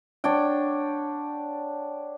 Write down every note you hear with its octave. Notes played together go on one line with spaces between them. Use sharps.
D4 C#5 F#5 G5